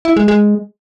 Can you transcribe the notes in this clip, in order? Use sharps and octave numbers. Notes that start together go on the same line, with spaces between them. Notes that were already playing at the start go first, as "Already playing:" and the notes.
E4
G#3
G#3